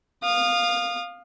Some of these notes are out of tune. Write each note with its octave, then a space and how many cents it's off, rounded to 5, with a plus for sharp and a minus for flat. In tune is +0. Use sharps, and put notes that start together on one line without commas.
F5 +10 D#6 -25